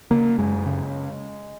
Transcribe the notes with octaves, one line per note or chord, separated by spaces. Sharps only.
C#3 A#3
F#2 G#3
C#3